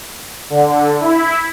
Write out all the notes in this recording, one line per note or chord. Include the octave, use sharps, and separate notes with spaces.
D3
E4